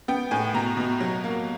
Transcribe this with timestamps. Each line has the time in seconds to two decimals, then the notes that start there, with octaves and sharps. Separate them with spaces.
0.08 B3 G5
0.31 A2 G#5
0.54 B2 A#5
0.77 B2
1.01 F#3
1.24 A#3